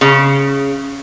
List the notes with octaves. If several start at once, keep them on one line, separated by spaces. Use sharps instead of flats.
C#3